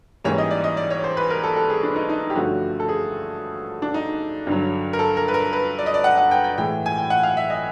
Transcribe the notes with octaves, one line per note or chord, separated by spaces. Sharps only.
G#2 E3 G3 A#3 C#4 C#5
D#5
D5
D#5
D5
C#5
C5
B4
A#4
A4
A4
G#4
D4
D#4
D#4
G4
G2 D3 F3 A3 C#4 F#4
A4
G#4
D4
D#4
G2 D3 F#3
A#4
A4
A#4
B4
A#4
B4
D5
D#5
D5
F#5
F#5
G5
G5
A2 E3 G#3 G5
G#5
G5
F#5
F5
E5
D#5